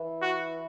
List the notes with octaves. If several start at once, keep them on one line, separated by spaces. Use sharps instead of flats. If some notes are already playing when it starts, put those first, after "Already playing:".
Already playing: E3
F#4